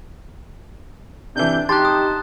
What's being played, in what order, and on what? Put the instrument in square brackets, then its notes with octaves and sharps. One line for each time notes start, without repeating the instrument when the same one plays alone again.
[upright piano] C3 E3 [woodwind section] D4 [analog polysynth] G6
[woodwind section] D#4 A5 [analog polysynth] G4 [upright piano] C6 [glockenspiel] F#6 A6
[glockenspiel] D#6